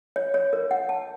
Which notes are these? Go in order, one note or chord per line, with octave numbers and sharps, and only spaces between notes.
C#5
C#5
A#4
F#5
A5